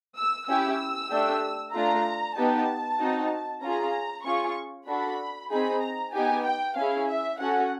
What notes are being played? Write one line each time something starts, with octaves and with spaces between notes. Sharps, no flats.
E6
C#4 E4 G4 E6
A3 D4 G4
A3 D4 F4 A#5
B3 D#4 G4 A5
C4 D#4 F#4
C#4 F4 G#4 A#5
C#4 F4 G#4 C#6
D4 F#4 A4 B5
C4 D#4 G#4 B5
A#5
B3 D#4 G4 G#5
G5
C#4 E4 G#4 F5
E5
C#4 F#4 A4 F#5